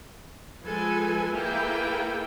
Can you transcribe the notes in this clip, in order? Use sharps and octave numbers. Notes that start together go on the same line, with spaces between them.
F3 G#3 A4 B4 G#5
A#3 E4 G#4 A4 B4 G5